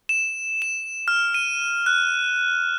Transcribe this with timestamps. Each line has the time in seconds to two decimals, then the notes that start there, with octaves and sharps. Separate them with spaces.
0.09 E7
0.62 E7
1.08 F6
1.34 D#7
1.86 F#6